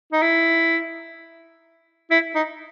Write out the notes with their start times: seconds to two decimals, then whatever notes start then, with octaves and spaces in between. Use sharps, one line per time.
0.12 D#4
0.22 E4
2.11 E4
2.35 D#4